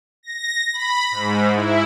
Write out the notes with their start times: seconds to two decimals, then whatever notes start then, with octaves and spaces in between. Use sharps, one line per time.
0.23 A#6
0.73 B5
1.11 G#2
1.55 E4